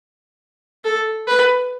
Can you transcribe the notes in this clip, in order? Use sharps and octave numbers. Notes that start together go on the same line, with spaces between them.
A4
B4